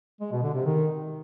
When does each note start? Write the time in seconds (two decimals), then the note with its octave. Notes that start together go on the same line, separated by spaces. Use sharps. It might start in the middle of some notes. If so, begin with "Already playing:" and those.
0.20 G#3
0.32 B2
0.43 D3
0.54 C3
0.65 D#3